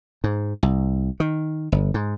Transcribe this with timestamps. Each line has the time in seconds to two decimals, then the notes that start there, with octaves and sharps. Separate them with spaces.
0.24 G#2
0.63 C2
1.20 D#3
1.72 G1
1.94 G#2